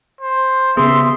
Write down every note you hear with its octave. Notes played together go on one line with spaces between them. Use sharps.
C5
C#3 B3 G#4 E5 C6